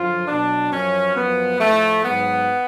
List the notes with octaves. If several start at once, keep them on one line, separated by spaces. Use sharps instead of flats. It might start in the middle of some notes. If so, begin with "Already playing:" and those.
Already playing: F#2 D3 F3 F4
B2 F#3 D4
F#2 F3 C#4
F#2 F3 B3
A2 F3 A3
G#2 F#3 B3